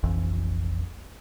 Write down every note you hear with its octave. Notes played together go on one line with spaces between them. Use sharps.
F1 A#1 F2 E3